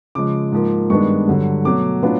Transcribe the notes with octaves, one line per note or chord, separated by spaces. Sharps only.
C#3 F3 G#3 D6
G#2 F3 A#3
G2 D#3 G#3 B3 D4 C#6
G2 D3 F#3
B2 F#3 A3 D6
A2 F#3 B3 D4 F4